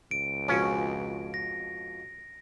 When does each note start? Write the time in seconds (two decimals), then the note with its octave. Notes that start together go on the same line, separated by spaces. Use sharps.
0.11 C#2 D7
0.49 F2 G#2 B2 C#4
1.34 A#6